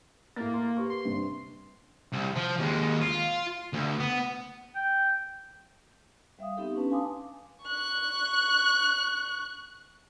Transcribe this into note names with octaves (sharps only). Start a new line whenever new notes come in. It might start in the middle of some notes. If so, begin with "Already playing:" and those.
A2 A#3 A6
C6
G4 B4 C#6
C6
G2 C3
C2
F3
D#2 G#3
F4
D2
B3
G5
G3 E5 F5 D#6
B3 C4 D#4 G4 A4
C#4 D4 B4 A5
F5 G#5 C6 D6 D#6
C#6 F#6